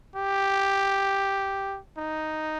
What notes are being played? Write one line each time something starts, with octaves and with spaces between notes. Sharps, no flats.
G4
D#4